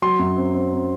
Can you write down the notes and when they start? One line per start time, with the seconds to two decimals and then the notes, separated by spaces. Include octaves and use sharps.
0.02 F#3 C6
0.19 F#2
0.37 C4
0.54 C4
0.73 C4